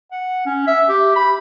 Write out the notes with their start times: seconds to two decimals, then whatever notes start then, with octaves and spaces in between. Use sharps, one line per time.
0.11 F#5
0.46 C#4
0.67 E5
0.89 G4
1.16 B5